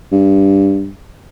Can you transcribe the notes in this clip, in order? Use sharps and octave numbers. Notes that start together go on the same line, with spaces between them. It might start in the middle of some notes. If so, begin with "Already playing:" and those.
G2